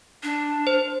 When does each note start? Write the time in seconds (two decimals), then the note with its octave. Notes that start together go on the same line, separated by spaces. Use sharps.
0.23 D4
0.67 C5